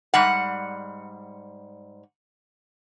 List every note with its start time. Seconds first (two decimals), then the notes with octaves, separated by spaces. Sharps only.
0.14 G#2 G3 F#5